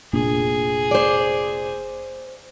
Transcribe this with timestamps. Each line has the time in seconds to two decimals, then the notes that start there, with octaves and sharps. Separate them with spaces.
0.13 F1 A#2 D4 G#4
0.91 C5 D5